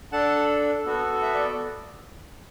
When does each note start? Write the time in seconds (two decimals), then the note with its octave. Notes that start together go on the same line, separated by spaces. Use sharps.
0.12 D4 A4 F#5 A5
0.86 B3 F#4 A4
1.22 E5
1.34 D5